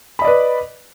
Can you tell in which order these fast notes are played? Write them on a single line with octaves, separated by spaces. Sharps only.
B5 D#5 D5 B4